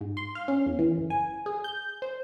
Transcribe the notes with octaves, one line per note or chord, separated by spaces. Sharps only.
G#2
C6
F5
C#4
E2
E3
G1
G#5
G#4
G6
C5